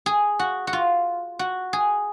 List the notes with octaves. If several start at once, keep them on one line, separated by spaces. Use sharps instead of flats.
G#4
F#4
F#4
F4
F#4
G#4